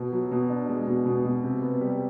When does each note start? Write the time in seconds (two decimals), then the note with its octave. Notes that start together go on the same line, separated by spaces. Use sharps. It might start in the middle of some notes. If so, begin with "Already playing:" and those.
Already playing: B2
0.12 F#3
0.31 B2
0.50 D4
0.69 G#3
0.87 B2
1.06 B2
1.25 B2
1.43 C3
1.62 B3
1.81 G3